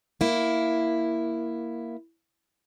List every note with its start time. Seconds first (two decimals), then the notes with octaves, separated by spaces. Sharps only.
0.21 A#3 E4